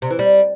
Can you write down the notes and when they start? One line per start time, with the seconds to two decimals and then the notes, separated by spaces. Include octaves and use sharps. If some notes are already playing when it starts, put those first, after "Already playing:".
0.02 C3
0.11 E3
0.19 G3